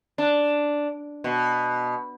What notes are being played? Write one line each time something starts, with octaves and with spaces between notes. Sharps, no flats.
D4
B2